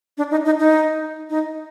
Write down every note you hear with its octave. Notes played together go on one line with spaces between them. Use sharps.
D4
D#4
D#4
D#4
D#4